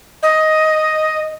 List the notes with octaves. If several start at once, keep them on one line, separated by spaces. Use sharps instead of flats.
D#5